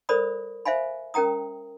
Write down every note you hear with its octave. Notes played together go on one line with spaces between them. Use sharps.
A4 A#4 C5 D5 B5 D#6
C5 E5 F5 G#5 B5
C#4 A#4 G5 A#5 D#6